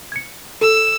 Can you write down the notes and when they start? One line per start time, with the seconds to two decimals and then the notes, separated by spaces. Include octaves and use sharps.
0.12 G#6 C#7
0.61 A4 E6